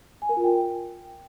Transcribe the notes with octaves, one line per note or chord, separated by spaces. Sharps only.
G#5
A#4
F4
G5